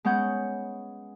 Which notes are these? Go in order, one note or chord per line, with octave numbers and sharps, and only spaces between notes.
G#3 B3 C#4 F#5 G6